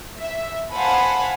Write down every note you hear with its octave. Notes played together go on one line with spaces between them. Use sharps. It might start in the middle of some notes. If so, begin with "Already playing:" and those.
E5
C5 F5 F#5 G#5 A5 B5